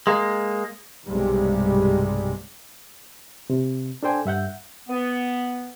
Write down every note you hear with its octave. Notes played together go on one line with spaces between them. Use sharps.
G#3 A#3
B1 G2 C3 G3 G#3
C3
D4 A4 C5 G5 G#5
G2 E5 F#5 G6
B3